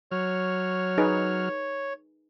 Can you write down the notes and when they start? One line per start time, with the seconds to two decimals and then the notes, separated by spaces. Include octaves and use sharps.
0.11 F#3 C#5 F6
0.98 D#4 G#4 B4